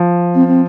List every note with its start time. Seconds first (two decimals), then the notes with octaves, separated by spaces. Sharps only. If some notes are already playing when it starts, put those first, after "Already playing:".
Already playing: F3
0.35 C4
0.47 C4